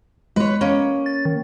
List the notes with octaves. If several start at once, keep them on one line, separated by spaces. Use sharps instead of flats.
G#3 B4 C#5
A#3 C#4
A6
D#3